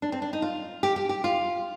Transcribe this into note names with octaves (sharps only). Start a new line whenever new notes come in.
D4
C4
D4
D#4
F4
G4
G4
G4
F4